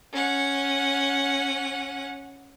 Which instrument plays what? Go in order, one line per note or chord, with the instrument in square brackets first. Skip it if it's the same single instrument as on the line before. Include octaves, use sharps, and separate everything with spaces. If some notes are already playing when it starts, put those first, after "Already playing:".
[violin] C#4 F#5